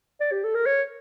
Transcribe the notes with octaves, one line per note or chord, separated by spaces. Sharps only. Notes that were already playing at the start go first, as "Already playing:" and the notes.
D5
G4
A4
A#4
C#5